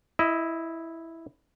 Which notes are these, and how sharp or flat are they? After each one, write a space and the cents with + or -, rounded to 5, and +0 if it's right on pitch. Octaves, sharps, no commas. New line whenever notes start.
E4 +0 D#5 +20